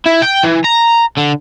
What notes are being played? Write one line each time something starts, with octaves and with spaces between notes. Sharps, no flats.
E4
G5
E3
A#5
D3